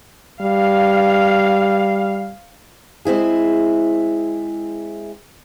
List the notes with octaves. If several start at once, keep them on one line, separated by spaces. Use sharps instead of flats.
G3 F5
G#3 C4 E4 G#4